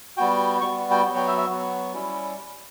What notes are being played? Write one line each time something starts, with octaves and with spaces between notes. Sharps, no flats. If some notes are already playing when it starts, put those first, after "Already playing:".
G3 B3 F#4 G5
G3 B3 F#4 C#6
G5
F#3 B3 F#4
G5
E5
E5
F#3 B3 F#4
G3 C#4 E4